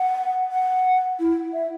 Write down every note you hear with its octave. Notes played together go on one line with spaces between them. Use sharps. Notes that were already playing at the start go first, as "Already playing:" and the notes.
Already playing: F#5
F#5
E4
E5